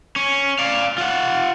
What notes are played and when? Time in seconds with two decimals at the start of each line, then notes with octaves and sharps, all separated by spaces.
0.16 C#4
0.59 D5 F5
0.98 F4 F#5